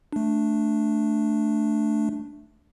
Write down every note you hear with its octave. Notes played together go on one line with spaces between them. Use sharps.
A3 D4